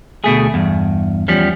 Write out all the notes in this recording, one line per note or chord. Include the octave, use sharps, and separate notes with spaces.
D2 B2 A3 G#4
E2 G2
E2 F3 G3 C#4